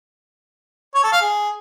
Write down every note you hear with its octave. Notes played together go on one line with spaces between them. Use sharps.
C#5
A4
F5
G#4